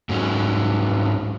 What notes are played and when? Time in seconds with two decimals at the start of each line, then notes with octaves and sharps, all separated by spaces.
0.09 G#2 F#3 C#4